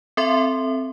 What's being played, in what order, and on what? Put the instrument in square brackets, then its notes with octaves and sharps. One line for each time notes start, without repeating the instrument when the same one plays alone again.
[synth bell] C4 A4 E5 C6